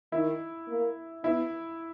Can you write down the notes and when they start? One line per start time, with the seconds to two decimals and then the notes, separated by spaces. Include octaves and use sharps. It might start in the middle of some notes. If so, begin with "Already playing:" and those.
0.12 D#3 E4
0.68 A#3
1.24 B3 E4